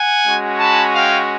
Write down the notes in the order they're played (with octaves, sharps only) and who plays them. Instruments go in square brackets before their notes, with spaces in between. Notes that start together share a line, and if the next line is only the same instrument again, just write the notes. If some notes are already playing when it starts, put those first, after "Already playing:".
Already playing: [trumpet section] F#5 G#5
G#3 C#4 F#4
A5 B5
F5 G5